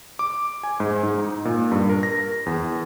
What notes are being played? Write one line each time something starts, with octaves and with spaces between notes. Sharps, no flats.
D6
G#5
G#2
G#2
D#4
A#2
G2
A#4
A#6
E2